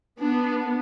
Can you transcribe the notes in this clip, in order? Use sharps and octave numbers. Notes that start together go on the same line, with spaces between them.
B3 D4